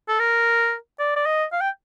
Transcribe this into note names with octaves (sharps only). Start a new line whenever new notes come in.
A4
A#4
D5
D5
D#5
F5
G5